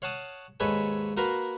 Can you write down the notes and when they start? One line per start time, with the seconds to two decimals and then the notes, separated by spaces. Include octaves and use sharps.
0.02 C#5 F5 F#5 A5 D#6
0.60 D#2 G#2 A4 B4 C#5 G#5
1.17 A#3 F#4 A#4 B4 F5 A#5